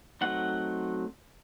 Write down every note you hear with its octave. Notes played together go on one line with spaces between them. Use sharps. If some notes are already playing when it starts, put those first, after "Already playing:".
F#3 A3 C4 D#4 F#5